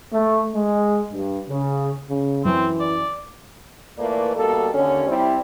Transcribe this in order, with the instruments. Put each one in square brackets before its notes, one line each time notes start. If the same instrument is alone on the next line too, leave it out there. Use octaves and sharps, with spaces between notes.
[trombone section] A3
G#3
G2
C#3
[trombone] C#3
[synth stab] F#2 [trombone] E3 [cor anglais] C4
[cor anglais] D5
[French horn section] A#2 E3 A3 A#3 B4 D5
D2 B2 G3 A#3 A4
D#2 D3 C#4
G3 C4 E4